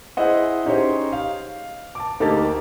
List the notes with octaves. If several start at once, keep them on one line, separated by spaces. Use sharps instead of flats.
E4 G#4 C5 D#5 F#5
C#4 D#4 G4 G#4 C5 C#5
F5
A5 D6
D2 A#3 D#4 G4 A5 A6